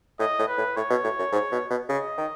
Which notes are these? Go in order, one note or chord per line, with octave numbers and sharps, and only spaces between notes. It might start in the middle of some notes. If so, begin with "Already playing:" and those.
A2 D#5
A2
B4
A2
A2 C#5
B2
A2
F#2
G#2
B2
B2
C#3 D#5
D#3